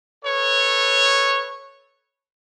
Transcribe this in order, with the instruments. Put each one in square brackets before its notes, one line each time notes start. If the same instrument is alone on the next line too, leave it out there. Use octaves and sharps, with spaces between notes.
[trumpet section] A4 B4 C#5